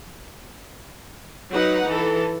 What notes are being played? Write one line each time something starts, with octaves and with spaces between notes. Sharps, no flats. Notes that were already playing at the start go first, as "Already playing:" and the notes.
F#3 D#4 B4 F#5
E3 A4